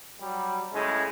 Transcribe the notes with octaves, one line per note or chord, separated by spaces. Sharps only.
F#3 G3
A2 C#3 G#3